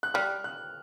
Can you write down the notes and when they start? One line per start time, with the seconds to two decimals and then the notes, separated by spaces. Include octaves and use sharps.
0.03 F#6
0.14 G3 F6
0.44 F#6